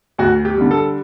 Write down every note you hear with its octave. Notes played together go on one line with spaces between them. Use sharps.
D2 F#4
G4
D3 G3
A4